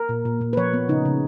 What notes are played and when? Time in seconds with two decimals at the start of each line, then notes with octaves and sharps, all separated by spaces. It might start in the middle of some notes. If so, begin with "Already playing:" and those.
Already playing: A#4
0.09 A#2
0.25 A#2
0.41 A#2
0.53 B4
0.57 F3 C#5
0.74 B3
0.89 C#3 D#4
1.05 C#3